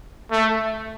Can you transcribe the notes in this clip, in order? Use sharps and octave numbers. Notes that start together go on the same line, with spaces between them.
A3